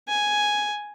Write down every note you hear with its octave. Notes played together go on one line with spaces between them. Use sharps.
G#5